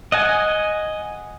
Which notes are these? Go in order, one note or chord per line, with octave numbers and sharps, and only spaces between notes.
D#5 F#5 G#5